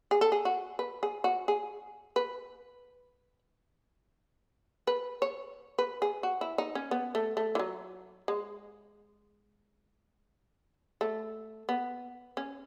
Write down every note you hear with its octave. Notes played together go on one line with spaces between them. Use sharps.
G#4
A4
G#4
F#4
B4
G#4
F#4
G#4
B4
B4
C#5
B4
G#4
F#4
E4
D#4
C#4
B3
A3
A3
E3
F#3
G#3
A3
B3
C#4